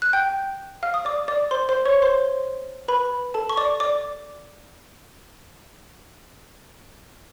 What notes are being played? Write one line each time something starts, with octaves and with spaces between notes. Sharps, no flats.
F#6
G5 G6
F5 F6
D#6
D5 D6
D5 D6
C5 C6
C5 C6
C#5 C#6
C5 C6
B4 B5
A4 A5
C#6
D5 D6
D5 D6